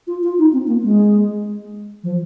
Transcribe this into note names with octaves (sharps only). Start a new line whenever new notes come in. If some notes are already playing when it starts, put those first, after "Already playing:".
F4
F4
D#4
C4
A#3
G#3
F3